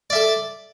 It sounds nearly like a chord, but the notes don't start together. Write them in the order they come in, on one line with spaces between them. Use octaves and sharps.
D5 E5 A4